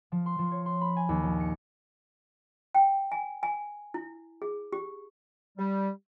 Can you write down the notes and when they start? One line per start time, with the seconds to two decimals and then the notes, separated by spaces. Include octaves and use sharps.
0.12 F3
0.26 C6
0.39 F3
0.51 C#5
0.66 C6
0.81 B5
0.97 G#5
1.09 D#2
1.23 A#1
1.40 C#7
2.75 G5
3.12 G#5
3.43 G#5
3.94 E4
4.42 G#4
4.73 G4
5.57 G3